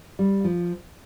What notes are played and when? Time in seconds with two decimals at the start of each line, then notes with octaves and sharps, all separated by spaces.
0.19 G3
0.44 F3